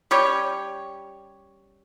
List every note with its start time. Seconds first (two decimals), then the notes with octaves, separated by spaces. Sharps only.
0.11 G3 C#4 G4 C#5